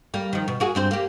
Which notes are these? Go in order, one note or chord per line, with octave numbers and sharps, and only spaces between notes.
G3 A#3
D#3 F3
B2
A#3 F#4 G#4
G2 C4 C5
A#3 G4